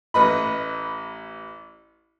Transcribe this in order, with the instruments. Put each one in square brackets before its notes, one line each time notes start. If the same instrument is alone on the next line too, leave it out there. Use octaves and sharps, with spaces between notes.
[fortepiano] A1 B4 D#5 B5